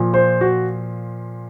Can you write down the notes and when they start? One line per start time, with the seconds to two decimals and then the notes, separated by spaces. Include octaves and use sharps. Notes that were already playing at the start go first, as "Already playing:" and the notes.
Already playing: A#2 F3
0.14 C5
0.41 F#4